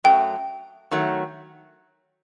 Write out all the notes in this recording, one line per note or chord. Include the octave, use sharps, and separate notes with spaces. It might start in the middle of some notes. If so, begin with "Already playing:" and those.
F#2 F#3 A3 G5
D#3 F#3 A3